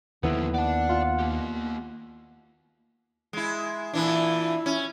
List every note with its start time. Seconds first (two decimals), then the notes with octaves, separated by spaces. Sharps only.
0.23 D#2 D3 D#3 F3 B3 E4
0.54 D5 F#5 A5
0.89 F4
1.19 A#3 G4
3.33 G#3 E4
3.93 A#2 E3 D4 E4
4.66 C#4